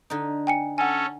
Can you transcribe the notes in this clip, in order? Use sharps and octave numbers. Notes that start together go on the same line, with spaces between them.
D3 D#4
G5 G#5 C#7
C#4 A4 F#5 G#5